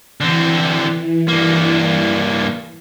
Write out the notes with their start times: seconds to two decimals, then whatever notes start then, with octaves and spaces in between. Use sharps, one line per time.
0.21 D3 E3 C4
1.28 G2 A#3